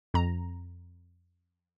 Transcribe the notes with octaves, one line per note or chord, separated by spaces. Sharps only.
F2 A#5